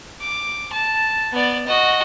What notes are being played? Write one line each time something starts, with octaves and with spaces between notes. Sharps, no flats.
D6
A5
B3 D5
F#4 D#5